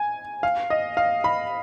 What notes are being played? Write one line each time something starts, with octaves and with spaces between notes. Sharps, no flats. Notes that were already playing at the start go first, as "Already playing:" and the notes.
Already playing: G#5
F5
D#5
F5
B5